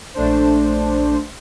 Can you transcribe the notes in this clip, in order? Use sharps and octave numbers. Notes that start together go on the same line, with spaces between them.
A#1 A3 D4 C5